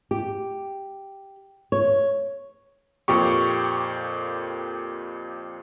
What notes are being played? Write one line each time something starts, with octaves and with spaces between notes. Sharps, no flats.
G4
C#5
F2 A#2 G4 C#6